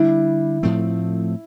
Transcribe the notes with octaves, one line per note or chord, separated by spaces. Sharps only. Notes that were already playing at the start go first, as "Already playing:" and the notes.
Already playing: D3 G3 D4 E4
A2 F3 A3 C4